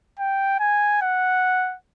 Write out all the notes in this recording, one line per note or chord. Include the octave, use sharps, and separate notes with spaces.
G5
G#5
F#5